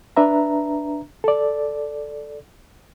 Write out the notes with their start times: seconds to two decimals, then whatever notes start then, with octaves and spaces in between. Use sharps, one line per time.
0.17 D4 B4 E5 A#5
1.24 A4 D5